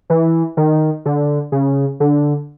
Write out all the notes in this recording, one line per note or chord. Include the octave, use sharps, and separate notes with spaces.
E3
D#3
D3
C#3
D3